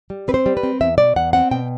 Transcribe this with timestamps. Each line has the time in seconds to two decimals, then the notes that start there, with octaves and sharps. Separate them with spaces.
0.10 G3
0.28 C4 B4
0.34 C5
0.46 G3
0.57 B4
0.63 C4
0.81 E2 E5
0.98 B2 D5
1.16 E2 F#5
1.33 C4 F#5
1.51 B2 G5